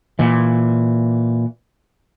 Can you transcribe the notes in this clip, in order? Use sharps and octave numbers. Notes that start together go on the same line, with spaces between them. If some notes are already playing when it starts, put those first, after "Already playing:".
A#2 E3